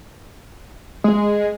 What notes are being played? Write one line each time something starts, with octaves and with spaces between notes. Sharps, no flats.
G#3